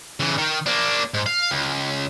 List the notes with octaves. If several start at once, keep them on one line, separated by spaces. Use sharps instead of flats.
C#3 E3
D#3
A#3 D4
G#2
F5
C#2